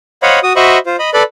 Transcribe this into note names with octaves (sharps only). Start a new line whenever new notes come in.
C5 C#5 D#5 F5 F#5 B5
F#4 D#6
F#4 C5 D#5 E5 B5 C#6
F4 C5
D#5 B5
A4 B4 D5 B5